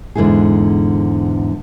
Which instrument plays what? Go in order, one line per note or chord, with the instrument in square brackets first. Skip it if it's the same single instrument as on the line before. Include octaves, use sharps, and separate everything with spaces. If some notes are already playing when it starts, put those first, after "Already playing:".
[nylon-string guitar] E2 G#2 D3 A3 E4 G#4